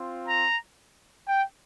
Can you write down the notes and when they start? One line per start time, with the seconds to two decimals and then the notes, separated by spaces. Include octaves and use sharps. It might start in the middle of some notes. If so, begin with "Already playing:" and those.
Already playing: C4 F4
0.27 A#5
1.28 G5